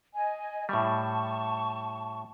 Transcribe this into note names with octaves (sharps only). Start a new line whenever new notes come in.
D#5 G#5
A2 G3 A5 C#6